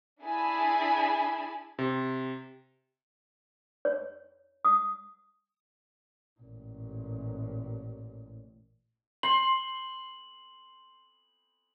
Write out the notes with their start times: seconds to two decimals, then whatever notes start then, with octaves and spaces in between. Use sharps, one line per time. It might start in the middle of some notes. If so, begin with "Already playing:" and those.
0.22 D4 E4 G#4 G#5 A5 B5
1.79 C3
3.85 C#5
4.65 D#6
6.40 A1 A#2
9.23 C6 F#7